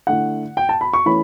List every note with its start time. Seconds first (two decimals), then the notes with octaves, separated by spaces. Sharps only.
0.07 D3 A3 E4 F#5
0.57 G5
0.69 A5
0.81 B5
0.93 C#6
1.06 E3 A3 C#4 E4 B5